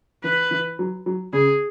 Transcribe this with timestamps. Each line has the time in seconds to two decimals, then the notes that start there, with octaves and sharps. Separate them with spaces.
0.23 E3 B4
0.51 E3
0.79 F#3
1.06 F#3
1.33 C#3 G#4